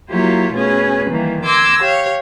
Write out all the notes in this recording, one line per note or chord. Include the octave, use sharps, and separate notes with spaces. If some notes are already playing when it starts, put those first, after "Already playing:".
F#3 A#3 E4 F4 G4 C#5
B2 A3 C#4 G#4 B4
D#3 E3 G3 A#3
C6 D6 E6 G#6 A#6
G4 C#5 F5